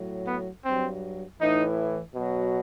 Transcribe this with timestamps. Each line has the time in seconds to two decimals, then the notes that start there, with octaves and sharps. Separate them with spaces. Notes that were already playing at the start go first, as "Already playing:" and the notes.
Already playing: A2 F#3
0.26 B3
0.64 G2 F#3 C4
1.40 A2 E3 D#4
2.15 B2 F#3